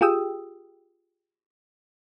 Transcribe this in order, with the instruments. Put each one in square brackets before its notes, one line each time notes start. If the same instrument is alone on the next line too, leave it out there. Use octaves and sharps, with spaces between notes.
[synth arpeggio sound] F4 G4 G#4 G5 D#6 E6